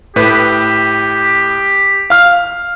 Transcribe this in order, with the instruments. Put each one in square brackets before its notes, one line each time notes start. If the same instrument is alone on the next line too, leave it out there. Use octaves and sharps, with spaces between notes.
[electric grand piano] A2 B4 [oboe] G4
[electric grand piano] F5 F6